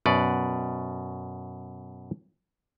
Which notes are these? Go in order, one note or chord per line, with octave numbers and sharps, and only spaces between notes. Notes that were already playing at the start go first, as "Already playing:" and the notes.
F#2 B2 B4 D5 F#5